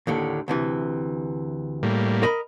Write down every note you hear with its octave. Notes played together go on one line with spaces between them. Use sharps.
D#2 A2 D3
D2 C3 E3
A2 G3 A#3
A#4 D#5 B5